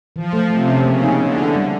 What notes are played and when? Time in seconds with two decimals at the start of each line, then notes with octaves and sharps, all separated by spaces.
0.16 E3 F3
0.33 A3
0.50 C3 A3
0.68 C#4
0.84 C#3 A#3
1.03 D#4
1.19 D3 B3
1.37 E4
1.55 G3